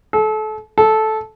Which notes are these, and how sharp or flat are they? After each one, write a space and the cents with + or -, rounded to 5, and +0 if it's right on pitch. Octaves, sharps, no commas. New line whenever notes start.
A4 -30
A4 -10